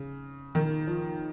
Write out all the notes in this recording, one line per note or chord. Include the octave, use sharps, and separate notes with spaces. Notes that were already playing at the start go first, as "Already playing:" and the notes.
Already playing: C#3
D#3
F3